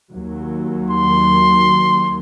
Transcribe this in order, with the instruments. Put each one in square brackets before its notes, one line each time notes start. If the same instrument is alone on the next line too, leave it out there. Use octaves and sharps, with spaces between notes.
[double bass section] D#2 F#3
[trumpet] C6